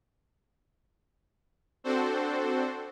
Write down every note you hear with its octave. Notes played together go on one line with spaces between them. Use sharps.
C4 D4 F#4 A4 C5